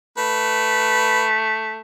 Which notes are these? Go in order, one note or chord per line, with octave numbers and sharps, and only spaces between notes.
A3 B4